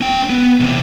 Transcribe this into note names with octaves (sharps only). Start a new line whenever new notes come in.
C#4 G5
B3
E2 C3